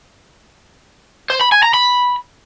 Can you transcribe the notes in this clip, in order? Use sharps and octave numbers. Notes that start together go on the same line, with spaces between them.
C5
B5
G#5
A#5
B5